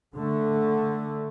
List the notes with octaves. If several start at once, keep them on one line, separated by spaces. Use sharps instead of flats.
D3 A3